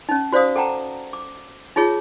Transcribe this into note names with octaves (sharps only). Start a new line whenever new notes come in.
C#4 D#4
F#4 C5 D5 F5 D#6
A4 F#5 G5 A5 A#5
D6
D#4 F4 G#4 C#5